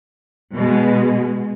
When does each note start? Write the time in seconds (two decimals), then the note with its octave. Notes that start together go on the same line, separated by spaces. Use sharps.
0.54 B2 G#3